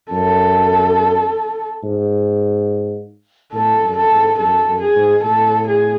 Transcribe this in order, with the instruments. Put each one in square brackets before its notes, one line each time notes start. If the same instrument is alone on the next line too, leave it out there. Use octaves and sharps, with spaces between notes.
[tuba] F#2 [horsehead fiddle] A4
[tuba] G#2
[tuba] A2 [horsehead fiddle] A4
[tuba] F#2
[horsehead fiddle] A4
[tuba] G#2
[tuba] F#2 [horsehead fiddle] A4
[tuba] F#2
[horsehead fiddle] G#4
[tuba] G#2
[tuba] A2 [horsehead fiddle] A4
[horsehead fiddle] G#4